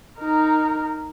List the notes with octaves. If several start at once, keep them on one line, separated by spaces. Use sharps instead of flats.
D#4 A#4